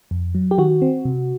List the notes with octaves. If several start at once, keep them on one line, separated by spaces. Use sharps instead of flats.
F2
F#3
G4
D#3 F#4
C4
C3